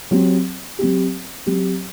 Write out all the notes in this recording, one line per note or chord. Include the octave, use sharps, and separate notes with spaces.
F#3 C4 G4
F#3 C4 G4
F#3 C4 G4